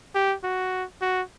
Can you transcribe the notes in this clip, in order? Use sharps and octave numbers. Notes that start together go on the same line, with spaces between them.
G4
F#4
F#4